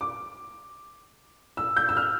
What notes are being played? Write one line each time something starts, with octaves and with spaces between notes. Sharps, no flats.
D6
E6
G6
E6
F6